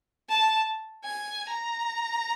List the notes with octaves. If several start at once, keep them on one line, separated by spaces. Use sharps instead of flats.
A5
G#5
A#5